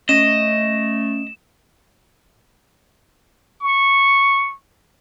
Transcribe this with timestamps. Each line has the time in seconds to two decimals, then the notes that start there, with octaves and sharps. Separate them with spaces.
0.09 A3 C#4 D#5 E7
3.61 C#6